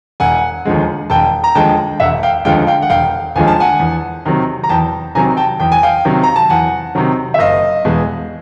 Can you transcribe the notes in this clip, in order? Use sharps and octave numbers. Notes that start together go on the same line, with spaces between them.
E1 F#5 G#5
D#2 D3 F3 G#3
E1 G5 A5
A#5
D#2 D3 F3 G#3 G5 A5
E1 E5 F#5
F5 G5
D#2 D3 F3 G#3 F5 G5
F5 G5
F#5
E1 F5 G5
D#2 D3 F3 G#3 G#5
A5
F#5 G#5
E2
C3 D#3 F#3
A#5
E2 G5 A5
C3 D#3 F#3 G#5 A#5
G5 A5
E2 G5
G#5
F5 G5
C3 D#3 F#3
A#5
A5
E2 F#5 G#5
C3 D#3 F#3
E5
F#1 D#5 F5
E2 B2 G#3 B3